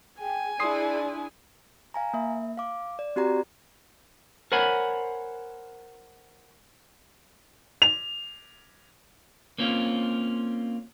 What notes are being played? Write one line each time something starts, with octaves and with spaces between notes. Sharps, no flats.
G#4 G5 G#5
D4 E4 G#4 D5 C6 D#6 C7
F5 G#5 A#5
A#3 E5
F5 D6
D5
C4 F#4 G4 D5 A#5
A#4 C5 C#5 F#5 G#5 B5
F7
A#3 C4 C#4 F4